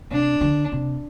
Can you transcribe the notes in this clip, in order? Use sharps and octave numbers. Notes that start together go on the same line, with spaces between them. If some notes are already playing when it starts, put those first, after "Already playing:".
C3 D4
D3
C3